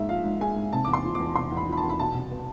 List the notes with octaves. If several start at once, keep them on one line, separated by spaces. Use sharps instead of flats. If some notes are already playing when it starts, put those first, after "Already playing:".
Already playing: G#2 G#3 E5
F3 F5
G#2
G#3 G#5
G#2
C3 A5
E2 D6
C6
F3
E2 D6
C3 C6
E2
B5
F3
B5
A5
E2
B5
B2 A5
C2
B3